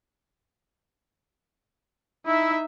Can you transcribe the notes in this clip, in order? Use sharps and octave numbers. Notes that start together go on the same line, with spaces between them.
D#4 E4 E5